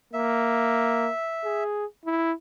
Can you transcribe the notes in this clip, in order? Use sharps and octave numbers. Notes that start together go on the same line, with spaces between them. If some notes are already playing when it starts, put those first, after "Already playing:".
A#3 E5
G#4
E4